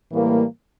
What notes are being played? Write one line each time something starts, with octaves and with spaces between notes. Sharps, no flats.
A2 E3 G3 A#3